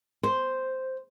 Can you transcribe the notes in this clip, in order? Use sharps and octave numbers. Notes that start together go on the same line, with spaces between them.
C5